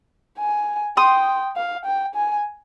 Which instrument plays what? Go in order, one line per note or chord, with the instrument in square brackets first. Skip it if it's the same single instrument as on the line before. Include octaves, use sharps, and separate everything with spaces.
[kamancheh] G#5
[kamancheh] G5 [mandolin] C6 D#6
[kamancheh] F5
G5
G#5